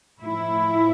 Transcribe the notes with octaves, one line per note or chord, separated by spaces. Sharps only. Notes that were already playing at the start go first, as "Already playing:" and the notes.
A2 F3 E4